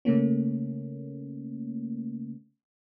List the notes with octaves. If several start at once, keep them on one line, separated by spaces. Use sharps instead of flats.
C#3 A3 A#3 C#4